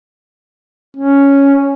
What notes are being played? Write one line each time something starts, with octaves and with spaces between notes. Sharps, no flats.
C#4